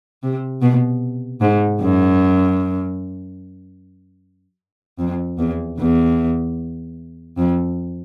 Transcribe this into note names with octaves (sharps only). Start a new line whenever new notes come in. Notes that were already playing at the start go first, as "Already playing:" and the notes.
C3
B2
G#2
F#2
F2
E2
E2
F2